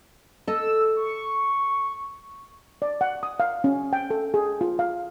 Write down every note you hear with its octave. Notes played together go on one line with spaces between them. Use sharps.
A4 D#5 E6
C#6
D5
F#5
D#6
F5
C#4
G5
A4
G#4
F4
F5